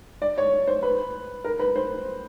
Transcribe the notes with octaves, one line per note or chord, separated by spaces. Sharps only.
D5
C#5
C5
B4
A#4
B4
C5